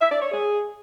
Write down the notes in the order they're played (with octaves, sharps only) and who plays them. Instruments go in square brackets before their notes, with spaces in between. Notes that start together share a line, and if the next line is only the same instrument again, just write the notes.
[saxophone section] E5
D5
C#5
G#4